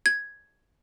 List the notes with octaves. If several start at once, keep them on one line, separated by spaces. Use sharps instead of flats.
G#6